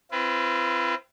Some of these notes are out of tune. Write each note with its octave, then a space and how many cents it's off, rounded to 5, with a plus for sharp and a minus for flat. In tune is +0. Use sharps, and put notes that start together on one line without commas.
C4 +0 F4 -45 B4 +0